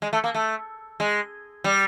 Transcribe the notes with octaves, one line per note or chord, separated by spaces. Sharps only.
G#3
A3
A#3
A3
G#3
G3